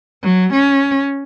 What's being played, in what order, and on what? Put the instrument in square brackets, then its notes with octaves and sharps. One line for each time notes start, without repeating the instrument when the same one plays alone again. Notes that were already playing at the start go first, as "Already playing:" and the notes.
[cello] F#3
C#4